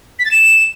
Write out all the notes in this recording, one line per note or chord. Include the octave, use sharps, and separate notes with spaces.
B6
A6
E7